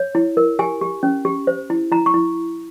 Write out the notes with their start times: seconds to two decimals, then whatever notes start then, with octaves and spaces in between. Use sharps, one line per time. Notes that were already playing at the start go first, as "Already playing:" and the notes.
Already playing: C#5
0.15 E4
0.37 A#4
0.59 G4 G#5
0.81 G4
1.03 C#4
1.25 G4
1.47 C5
1.70 E4
1.92 E4 A#5
2.06 C#6
2.14 E4